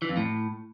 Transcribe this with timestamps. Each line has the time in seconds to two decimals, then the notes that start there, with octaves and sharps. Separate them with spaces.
0.02 E3
0.09 F2
0.17 A2